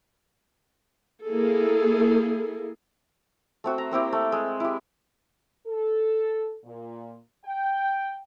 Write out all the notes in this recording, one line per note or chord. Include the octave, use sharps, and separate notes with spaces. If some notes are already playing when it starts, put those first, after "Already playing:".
A#3 E4 G#4 A4
A3 C4 F#4
A#5
A#3 C4 E4 G4
A3
G#3
E4 G4
A4
A#2
G5